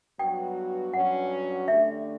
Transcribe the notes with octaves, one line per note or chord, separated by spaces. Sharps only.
G2 F#3 B3 F#4 G5
G2 F#3 C#4 F#4 F#5
D3 A3 D4 G4 E5